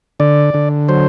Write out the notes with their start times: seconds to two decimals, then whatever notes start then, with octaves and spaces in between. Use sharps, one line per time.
0.20 D3 D5
0.54 D3
0.89 F#3 C5